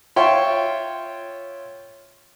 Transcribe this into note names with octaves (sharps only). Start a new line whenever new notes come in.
F4 C#5 E5 G5 C6 C#6